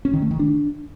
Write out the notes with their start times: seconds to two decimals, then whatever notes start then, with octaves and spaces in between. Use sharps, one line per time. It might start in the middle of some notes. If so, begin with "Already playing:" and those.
0.05 C#4
0.14 D#3
0.22 A3
0.31 D#3
0.39 D4